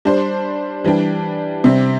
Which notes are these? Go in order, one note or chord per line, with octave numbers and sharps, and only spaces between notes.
G3 D4 C5
E3 G3 D4 G4
C3 G3 C4